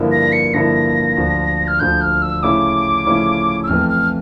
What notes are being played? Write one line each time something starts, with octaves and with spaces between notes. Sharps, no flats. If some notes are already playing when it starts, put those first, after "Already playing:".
Already playing: G2 D3 F3 A#3 E4
A#6
C#7
G2 D3 F3 A#3 E4 A#6
D2 D3 F3
F6
D2 D3 F3 G6
F6
E6
C#3 F3 A3 C#4 E4 D6
C#3 F3 A3 C#4 E4
E6
F2 E3 A3 F6
F6